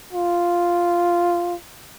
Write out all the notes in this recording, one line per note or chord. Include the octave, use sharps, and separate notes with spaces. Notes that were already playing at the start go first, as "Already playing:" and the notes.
F4